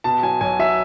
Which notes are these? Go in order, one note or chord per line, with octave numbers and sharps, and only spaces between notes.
B2 A5
F#3 G#5
B1 G#5
F#3 E5